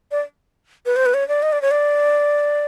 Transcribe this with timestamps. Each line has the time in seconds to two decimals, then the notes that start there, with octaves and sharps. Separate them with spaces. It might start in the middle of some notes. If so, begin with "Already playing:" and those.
0.11 D5
0.86 B4
0.96 C5
1.06 B4
1.14 C#5
1.28 D5
1.43 D#5
1.52 D5
1.62 C#5
1.71 D5